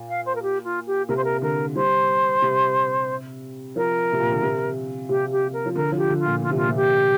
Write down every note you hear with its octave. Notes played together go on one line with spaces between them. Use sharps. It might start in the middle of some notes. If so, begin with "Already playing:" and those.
Already playing: A#2
F5
C5
A#4
G4
F4
G4
C3 A#4
C5
A#4
D3 A#4
G3 C5
C3
F3 A#4
C3
A#2
D3
C3
C3 G4
G4
A#4
F3
D3 A#4
F3
G4
D3
F4
A#2
D3 F4
C3
A#2 F4
C3
G4